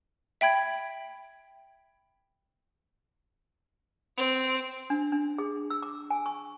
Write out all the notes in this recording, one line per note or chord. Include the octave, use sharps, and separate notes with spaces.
E5 G5 B5 G#6 D7
C4
D4
D4
G#4
E6
D6
G#5
C#6